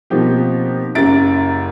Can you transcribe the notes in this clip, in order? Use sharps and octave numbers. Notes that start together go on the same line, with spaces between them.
B2 F3 A#3 C4 D#4 G4
F#1 F#2 G4 E5 A6 D7